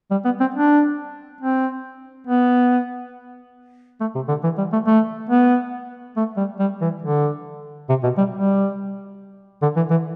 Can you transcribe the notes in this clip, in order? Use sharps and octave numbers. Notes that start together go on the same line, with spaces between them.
G3
B3
C4
D4
C4
B3
A3
C3
D3
E3
G3
A3
A3
B3
A3
G3
G3
E3
D3
C3
B2
G3
G3
D3
E3
E3